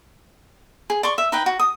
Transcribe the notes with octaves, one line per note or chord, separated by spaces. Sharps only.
G#4
D5 C6 C#6
E5
D#4 B4 G5
F#4
D#6